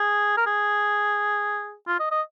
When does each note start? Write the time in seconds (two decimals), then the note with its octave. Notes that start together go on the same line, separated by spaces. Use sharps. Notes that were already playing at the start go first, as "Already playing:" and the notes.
Already playing: G#4
0.37 A#4
0.47 G#4
1.88 F4
2.00 D#5
2.11 D#5